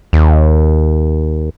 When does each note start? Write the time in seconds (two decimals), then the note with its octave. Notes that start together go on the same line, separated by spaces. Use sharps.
0.13 D#2